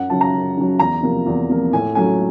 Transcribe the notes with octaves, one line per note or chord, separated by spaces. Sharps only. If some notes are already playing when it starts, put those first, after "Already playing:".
Already playing: F#2 F#5
C#3 F#3 A5
A#5
F#2
C#3 F#3
E2 A#5
C3 F3 A#3
E2
C3 F3 A#3
A2 G#5
F#3 A3 C#4 G#5